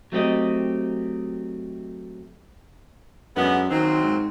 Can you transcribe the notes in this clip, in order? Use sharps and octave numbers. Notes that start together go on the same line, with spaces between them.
F#3 A3 C4 G4 D#5
F#2 D3 G#3 B3
A#2 D#3 F#3 C4
G#2